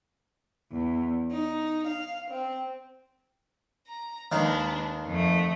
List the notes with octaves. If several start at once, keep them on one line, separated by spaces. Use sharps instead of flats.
E2
D#4
F5
C4
A#5
D#2 D#3 G#3 D4 B4 F5
F2 A3